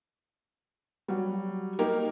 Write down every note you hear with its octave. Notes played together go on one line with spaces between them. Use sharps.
F#3 G3
A#3 D#4 G4 A#4